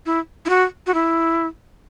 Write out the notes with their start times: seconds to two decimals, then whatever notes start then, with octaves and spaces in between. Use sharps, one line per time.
0.06 E4
0.46 E4
0.49 F#4
0.87 F#4
0.94 E4